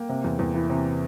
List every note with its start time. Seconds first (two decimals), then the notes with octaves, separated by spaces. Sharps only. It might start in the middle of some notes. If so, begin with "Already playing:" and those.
Already playing: A#3 G5
0.09 C3
0.24 E2
0.39 E2
0.54 E3
0.70 C3